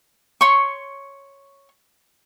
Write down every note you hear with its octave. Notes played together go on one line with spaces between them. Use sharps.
C#5 C6 C#6